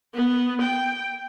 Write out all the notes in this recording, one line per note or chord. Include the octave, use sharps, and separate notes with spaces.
B3
G5